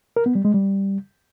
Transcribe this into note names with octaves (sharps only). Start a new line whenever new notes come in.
A#4
B3
G3
G#3
G3